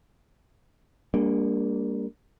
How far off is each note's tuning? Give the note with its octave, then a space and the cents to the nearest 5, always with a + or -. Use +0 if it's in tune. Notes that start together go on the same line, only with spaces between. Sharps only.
G3 +45 A#3 +0 D4 -15